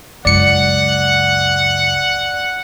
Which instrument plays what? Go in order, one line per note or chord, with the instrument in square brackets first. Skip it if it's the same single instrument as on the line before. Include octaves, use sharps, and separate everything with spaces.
[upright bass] C#2 F#2 [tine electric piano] D5 C#7 [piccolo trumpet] F#5